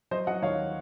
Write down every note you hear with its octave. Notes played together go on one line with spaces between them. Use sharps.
F#3 C5 D#5
F#3 D#5 F#5
D#2 C#5 F5